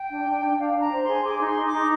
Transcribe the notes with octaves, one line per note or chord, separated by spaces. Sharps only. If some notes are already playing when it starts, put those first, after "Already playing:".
Already playing: G5
D4
D4
D4
D4 F5
D4
A#5
C5
C6
G#4
G#4 D6
D#4
C6
D#4
D6
D#4